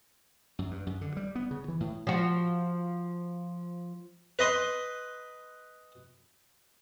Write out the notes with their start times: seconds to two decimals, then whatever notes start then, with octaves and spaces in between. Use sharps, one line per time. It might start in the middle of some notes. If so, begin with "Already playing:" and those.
0.59 F#2
0.71 G2
0.87 F#2
1.01 D3
1.17 G3
1.35 B3
1.51 C#3
1.68 E3
1.80 A2
2.07 F3 F#4
4.39 B4 D#5 C6